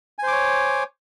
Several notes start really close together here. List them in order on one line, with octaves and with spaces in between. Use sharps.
G#5 C5 D6 C#5